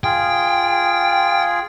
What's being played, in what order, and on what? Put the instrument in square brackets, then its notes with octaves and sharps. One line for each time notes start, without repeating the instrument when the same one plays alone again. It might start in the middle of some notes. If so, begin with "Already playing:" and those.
[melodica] F4 G#4 [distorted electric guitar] G5